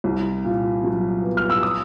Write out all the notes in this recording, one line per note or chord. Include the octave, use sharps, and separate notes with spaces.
C2
A#2
F#3
B3
F6
E6
D#6